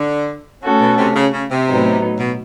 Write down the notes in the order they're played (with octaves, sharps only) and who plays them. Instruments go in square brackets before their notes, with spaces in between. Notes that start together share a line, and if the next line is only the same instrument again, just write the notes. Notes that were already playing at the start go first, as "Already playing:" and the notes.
Already playing: [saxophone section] D3
[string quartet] A3 C#4 F#4 A4
[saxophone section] B2
C3
C#3
C#3
C3
[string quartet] A2 F#3 B3 D#4
[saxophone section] B2